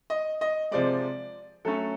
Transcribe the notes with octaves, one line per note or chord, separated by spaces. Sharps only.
D#5
D#5
C3 F3 G#3 D5
F#3 A3 C#4 A4